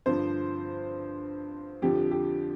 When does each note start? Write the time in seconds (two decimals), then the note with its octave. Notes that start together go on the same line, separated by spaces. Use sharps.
0.06 G2 D3 F3 C5
1.82 F2 D3 F3 G4
2.11 G4